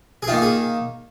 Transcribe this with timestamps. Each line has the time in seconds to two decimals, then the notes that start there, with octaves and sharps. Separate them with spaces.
0.23 G#4
0.27 D#3 A#3 F4
0.42 G#4